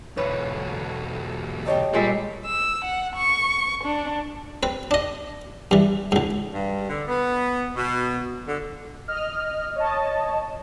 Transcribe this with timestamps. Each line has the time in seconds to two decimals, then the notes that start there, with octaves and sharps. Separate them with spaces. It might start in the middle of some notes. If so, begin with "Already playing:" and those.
0.17 B1 E2 D3 B4 C#5
1.66 G4 C#5 D#5 A5
1.94 A#2 G3 G#3 E5
2.46 E6
2.85 F#5
3.16 C#6
3.84 D4
4.63 C4 B4
4.91 D4 D#5
5.71 G2 E3
6.12 C#2 G#2
6.53 G2
6.88 D3
7.07 B3
7.75 B2
8.47 D3
9.08 D#5 F6
9.76 C#5 D#5 A5